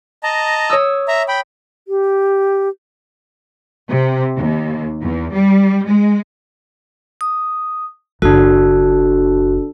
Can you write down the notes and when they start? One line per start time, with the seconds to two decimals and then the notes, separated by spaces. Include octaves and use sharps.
0.23 D#5 A5 A#5
0.70 C#5 D#6 E6
1.08 E5 A#5
1.28 G5 B5
1.88 G4
3.90 C3
4.37 D#2
5.02 E2
5.32 G3
5.87 G#3
7.21 D#6
8.22 F#1 D4 F#4 A4